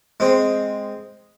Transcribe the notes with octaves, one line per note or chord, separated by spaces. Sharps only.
G#3 C4